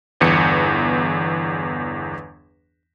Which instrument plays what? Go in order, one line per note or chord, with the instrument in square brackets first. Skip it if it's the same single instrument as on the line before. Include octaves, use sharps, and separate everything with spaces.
[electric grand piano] G1 E2 C#7